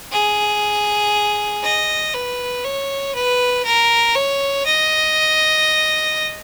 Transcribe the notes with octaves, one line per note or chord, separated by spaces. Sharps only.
G#4
D#5
B4
C#5
B4
A#4
C#5
D#5